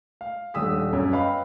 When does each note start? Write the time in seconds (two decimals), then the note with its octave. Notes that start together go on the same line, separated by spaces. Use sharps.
0.21 F5
0.54 D#1 D3 D#6 E6 B6
0.93 F#2 C#5
1.13 B4 D#5 F5 G5 B5